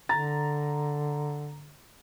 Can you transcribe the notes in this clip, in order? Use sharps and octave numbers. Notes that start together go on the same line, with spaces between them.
D3 A#5 A6